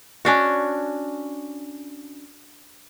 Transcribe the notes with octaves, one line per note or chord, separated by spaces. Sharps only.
C#4 D4 F#4